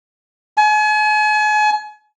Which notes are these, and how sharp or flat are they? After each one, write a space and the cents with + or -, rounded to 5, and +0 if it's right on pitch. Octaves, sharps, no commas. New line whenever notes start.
G#5 +40